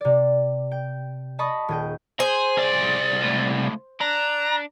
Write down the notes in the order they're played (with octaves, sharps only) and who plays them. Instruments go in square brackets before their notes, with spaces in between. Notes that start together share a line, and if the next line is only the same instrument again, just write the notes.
[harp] C3 D5
G5
D#5 A5 B5 C#6 D#6
D#1 G#4 G5
[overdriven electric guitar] G#4 [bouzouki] C5 [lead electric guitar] G#5
[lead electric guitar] C2 D5 [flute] A6
[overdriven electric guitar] C#2 A2
[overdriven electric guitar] D4 [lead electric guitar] A#5 [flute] F#6